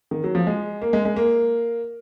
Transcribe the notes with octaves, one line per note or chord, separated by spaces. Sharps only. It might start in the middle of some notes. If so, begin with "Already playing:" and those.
D#3
F#3
F3
G#3
A#3
G#3
G#3
A#3